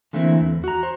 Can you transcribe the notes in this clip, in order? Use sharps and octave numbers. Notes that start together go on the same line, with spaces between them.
D3 E3 A3 A#3 C4 E4
E2
F#4 A#5
C5